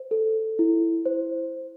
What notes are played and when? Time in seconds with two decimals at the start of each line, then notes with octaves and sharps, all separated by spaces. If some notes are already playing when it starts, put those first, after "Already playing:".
Already playing: C5
0.11 A4
0.59 E4
1.06 C5